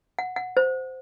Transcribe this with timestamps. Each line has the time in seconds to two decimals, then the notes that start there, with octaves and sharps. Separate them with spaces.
0.19 F#5
0.36 F#5
0.57 C5